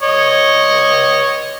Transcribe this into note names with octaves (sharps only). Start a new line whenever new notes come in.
C#5 D#5